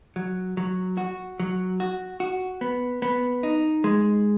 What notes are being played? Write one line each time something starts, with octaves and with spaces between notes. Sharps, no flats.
F#3
F#3
F#4
F#3
F#4
F#4
B3
B3
D#4
G#3